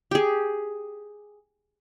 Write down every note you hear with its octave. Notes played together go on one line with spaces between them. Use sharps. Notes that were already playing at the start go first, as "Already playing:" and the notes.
G4 G#4